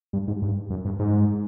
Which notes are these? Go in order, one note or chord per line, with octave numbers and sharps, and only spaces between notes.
G2
G#2
G2
F#2
G2
G#2